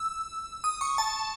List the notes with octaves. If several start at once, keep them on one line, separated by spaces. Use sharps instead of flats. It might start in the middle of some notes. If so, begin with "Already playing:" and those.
Already playing: E6
D#6
C#6
A5